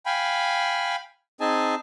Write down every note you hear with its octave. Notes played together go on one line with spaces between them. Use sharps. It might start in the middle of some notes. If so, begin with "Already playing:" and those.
F5 G5 G#5 B5
C4 D#4 G#4 D#5 G#5 A5